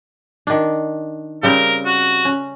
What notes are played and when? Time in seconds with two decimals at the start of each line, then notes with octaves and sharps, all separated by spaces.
0.47 D#3 D4
1.43 C#3 G3 C4 A#4
1.86 F#4
2.25 C#4